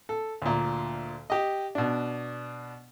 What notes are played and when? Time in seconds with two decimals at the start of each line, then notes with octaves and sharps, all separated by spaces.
0.09 A4
0.42 D2 A#2
1.30 G4 D#5
1.75 B2 D4